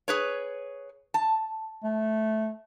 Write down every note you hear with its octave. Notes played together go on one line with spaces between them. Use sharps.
G#4 B4 C#5
A5
A3